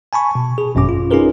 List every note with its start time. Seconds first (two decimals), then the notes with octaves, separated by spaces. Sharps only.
0.13 G#5 A5 B5 C#6
0.35 B2
0.58 G#4
0.75 G#1 F#2 B2 C#4 D6
0.89 F4
1.11 C#4 D#4 F4 G#4 A#4 B4